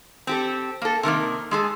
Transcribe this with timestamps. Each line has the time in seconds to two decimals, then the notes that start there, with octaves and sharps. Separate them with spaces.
0.27 C4 G4 A4
0.82 A#3 A4
1.03 C3 D#3 A3 A#3
1.51 G#3 G#4 A4